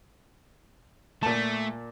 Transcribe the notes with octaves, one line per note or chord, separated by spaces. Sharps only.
A#2 A3 A5